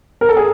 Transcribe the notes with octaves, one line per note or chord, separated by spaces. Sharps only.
A#4
A4
G#4